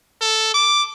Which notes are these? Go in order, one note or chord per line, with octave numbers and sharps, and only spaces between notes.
A4
D6